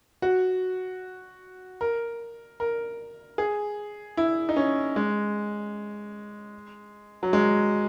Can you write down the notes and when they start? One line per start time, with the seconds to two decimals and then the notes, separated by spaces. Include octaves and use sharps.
0.22 F#4
1.81 A#4
2.60 A#4
3.38 G#4
4.17 E4
4.49 D#4
4.56 C#4
4.96 G#3
7.23 F#3
7.33 G#3